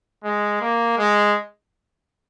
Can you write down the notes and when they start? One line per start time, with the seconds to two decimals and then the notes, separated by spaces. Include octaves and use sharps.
0.24 G#3
0.61 A#3
0.98 G#3